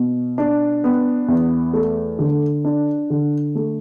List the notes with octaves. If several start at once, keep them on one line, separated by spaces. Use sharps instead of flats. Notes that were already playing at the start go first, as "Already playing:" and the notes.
Already playing: B2
D4
B3
E2
A3
D3
D4
D3
A3